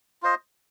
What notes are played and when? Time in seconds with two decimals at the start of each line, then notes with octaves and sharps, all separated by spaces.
0.22 F4 C5 D#5